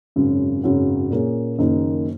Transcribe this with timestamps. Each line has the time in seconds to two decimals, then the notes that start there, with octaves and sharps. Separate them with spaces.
0.16 G#1 F#2 C#3
0.63 G#1 F#2 C#3 F#3
1.11 A#2 A#3 C#4 G#4
1.58 F#1 F#2 D#3 A#3 D#4